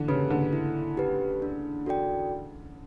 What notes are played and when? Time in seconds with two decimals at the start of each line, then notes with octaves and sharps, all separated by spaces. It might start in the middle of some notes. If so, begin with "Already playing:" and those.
Already playing: D3 E3
0.08 C#3 G4 B4
0.30 D3
0.53 E4
0.97 G4 B4
1.42 D4
1.86 F#4 A4 D5 G5